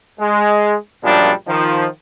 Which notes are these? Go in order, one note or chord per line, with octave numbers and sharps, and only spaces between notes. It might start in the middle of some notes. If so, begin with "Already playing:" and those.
G#3
F#2 A#2 F3 G3 G#3 D4
D#3 F3